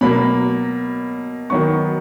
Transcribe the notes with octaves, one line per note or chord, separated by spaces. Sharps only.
B2 F#3 A#3 B5
D#3 F#3 B3 C#6